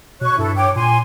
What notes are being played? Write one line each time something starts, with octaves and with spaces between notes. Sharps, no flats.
B2 C#5 C#6 F#6
G2 E4 A4
C#5 G5 D6
A#2 G#5 C6